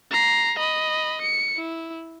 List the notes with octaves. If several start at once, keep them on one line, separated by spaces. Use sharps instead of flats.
A#5 C7
D#5 B5
C#7
E4